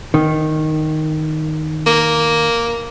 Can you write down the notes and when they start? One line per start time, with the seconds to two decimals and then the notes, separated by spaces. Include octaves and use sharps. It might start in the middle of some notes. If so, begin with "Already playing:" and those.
0.14 D#3
1.87 A#3